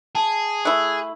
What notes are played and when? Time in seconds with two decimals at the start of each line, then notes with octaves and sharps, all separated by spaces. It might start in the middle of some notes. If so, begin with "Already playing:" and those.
0.15 G#4 A5
0.65 A3 E4 E6 F#6